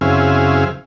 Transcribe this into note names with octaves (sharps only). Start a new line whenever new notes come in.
F#2 C#3 C4 E4 G#4 F5